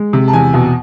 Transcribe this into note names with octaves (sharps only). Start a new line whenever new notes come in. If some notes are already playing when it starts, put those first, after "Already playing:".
Already playing: G#3
C3
A5
E2 G#5
B2